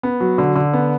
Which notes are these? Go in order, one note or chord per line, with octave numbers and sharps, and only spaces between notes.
B3
F#3
D3
D3
B3